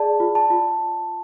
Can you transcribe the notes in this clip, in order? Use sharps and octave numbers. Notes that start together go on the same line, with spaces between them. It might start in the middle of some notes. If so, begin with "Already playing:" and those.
Already playing: G#4 D5 A5
F4
A5
F4